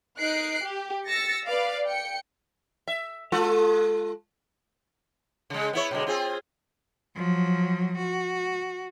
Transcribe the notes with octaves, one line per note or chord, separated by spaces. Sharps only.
D#4 F#6 C7 D7
G4
E6 A6 A#6 C#7
B4 D5 F5
G5 C#7
E5
G#3 F4 A4
C#3 G#3
B3 E4 C#5
B2 D3 G#3
C4 F4 G#4
F3 F#3
F#4